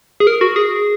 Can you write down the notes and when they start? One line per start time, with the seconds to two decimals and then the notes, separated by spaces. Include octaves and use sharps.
0.20 G#4
0.27 A#4
0.41 F#4
0.56 G#4